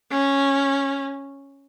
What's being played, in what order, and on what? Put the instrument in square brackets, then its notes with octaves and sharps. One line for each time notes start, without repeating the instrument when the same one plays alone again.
[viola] C#4